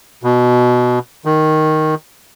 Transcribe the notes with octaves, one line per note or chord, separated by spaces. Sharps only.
B2
D#3